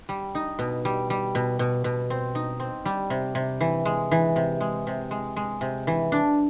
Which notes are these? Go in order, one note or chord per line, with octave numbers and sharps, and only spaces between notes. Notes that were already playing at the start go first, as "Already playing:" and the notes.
G3
D#4
B2
G3
G3
B2
B2
B2
C4
D#4
C4
G3
C3
C3
E3
G#3
E3
C3
G#3
C3
G#3
G#3
C3
E3
D4